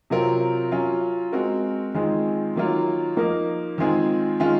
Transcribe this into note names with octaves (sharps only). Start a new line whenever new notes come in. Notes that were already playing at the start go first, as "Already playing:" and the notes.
C3 F#3 C4 F4 A#4
F#3 C#4 F4
G#3 C4 F#4 A#4
D#3 G#3 C4 F4 G#4
D#3 F#3 A#3 F4 A#4
F3 A#3 D#4 A#4
D#3 G#3 C4 F4 G#4
D#3 G#3 C#4 F4